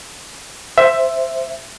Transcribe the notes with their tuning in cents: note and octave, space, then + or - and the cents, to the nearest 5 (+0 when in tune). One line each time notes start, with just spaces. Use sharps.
C5 +0 E5 +10